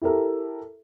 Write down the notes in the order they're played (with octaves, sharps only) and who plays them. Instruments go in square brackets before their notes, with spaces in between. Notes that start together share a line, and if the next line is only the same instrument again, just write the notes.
[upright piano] E4 G4 A4 A#4